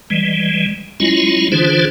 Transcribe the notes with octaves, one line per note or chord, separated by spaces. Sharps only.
E3 G3 G#3
F#3 G#3 C#4 E4 F4
D3 E3 D4 F4 G#4 C5